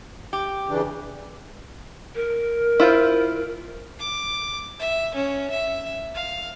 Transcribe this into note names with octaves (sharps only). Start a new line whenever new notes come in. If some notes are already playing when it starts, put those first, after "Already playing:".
G4
C#3 E3 D4
A#4
E4 F4 C5
D6
E5
C#4
E5
F5